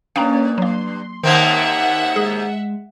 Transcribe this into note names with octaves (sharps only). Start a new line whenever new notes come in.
G2 A#3 C#4 F5 G5 A#5
F#3 A#3 C6
D#2 D#3 A#3 C4 E5 F#5
G#3 G#4